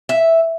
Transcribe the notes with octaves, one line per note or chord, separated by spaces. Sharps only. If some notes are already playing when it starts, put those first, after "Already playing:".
E5